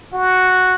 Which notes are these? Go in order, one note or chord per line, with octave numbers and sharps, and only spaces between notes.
F#4